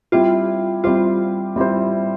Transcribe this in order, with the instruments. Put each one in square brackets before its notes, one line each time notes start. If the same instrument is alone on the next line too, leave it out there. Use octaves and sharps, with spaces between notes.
[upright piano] G3 C4 E4 G4 C5 [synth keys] F4
[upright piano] G3 C4 E4 G4 C5 [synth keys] F4
[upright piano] G3 C4 E4 G4 C5